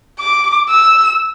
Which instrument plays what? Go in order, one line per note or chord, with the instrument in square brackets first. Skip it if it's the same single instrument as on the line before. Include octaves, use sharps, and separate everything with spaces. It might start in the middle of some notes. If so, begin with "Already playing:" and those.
[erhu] D6
E6